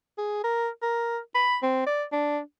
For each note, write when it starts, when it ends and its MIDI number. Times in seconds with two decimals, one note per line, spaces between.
0.18 0.43 68
0.44 0.69 70
0.82 1.18 70
1.35 1.57 83
1.63 1.85 60
1.87 2.04 74
2.12 2.40 62